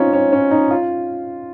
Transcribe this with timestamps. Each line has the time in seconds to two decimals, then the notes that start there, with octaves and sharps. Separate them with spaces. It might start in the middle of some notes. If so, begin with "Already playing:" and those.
Already playing: C4 C#4 D#4 F4
0.13 C#4
0.32 C#4
0.51 D#4
0.71 F4